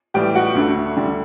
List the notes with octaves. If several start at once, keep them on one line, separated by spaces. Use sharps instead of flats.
A2 E3 G3 G4 G5
F#4 F#5
D2 D3 A3
D2 D3 G3